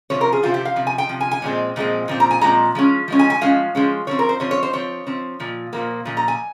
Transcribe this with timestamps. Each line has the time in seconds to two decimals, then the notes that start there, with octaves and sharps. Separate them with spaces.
0.10 C3 F3 C4 C#5
0.21 A#4
0.33 G#4
0.43 C3 F3 C4 F4
0.54 G4
0.65 F5
0.76 C3 F3
0.87 G#5
0.98 G5
1.09 C3 F3
1.20 G#5
1.31 G#5
1.42 A#2 F3 G#3 C4
1.76 A#2 F3 G#3 C4
2.08 A#2 F3 C4
2.20 A#5
2.31 G#5
2.41 A#2 F3 G#3 C4 A#5
2.75 F3 G#3 C#4
3.08 F3 G#3 C#4
3.19 G#5
3.30 G#5
3.41 F3 G#3 C#4 F5
3.75 F3 G#3 C#4
4.07 F3 C4 C#5
4.19 A#4
4.29 C5
4.40 F3 C4 C#5
4.51 C#5
4.63 C5
4.73 F3 C4 C#5
5.07 F3 C4
5.40 A#2 F3
5.73 A#2 F3 A#3
6.05 A#2 F3
6.17 A#5
6.28 G#5